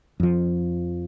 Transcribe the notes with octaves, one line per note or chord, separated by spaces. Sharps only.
F2 F3